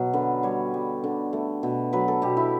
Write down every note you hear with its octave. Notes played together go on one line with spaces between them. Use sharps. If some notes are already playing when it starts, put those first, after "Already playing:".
Already playing: B2 F#3
D3 B4
G3 C#5
G3
D3
A3
B2
F#3 B4
A4
B2 G4
E4